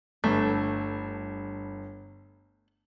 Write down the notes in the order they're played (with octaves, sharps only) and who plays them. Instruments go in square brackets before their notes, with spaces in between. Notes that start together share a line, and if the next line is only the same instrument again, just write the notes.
[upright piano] G1 G2 [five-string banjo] A3